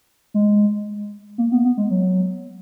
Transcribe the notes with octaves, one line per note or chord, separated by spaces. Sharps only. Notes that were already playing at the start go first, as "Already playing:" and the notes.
G#3
A#3
B3
B3
G#3
F#3